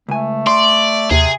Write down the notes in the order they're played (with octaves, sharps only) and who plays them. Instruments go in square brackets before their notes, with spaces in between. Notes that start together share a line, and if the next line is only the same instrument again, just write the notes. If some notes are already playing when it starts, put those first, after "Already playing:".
[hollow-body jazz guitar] C#2 G#5 [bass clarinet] A3
[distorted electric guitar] D5 [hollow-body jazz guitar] C6
[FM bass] D#2 [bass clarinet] C3 [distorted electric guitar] G#4